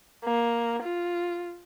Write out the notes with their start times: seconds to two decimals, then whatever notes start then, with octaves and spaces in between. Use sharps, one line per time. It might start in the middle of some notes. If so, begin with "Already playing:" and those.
0.24 A#3
0.82 F4